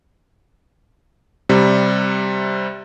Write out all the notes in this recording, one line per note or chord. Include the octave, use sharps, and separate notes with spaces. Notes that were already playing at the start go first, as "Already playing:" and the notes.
C3 G3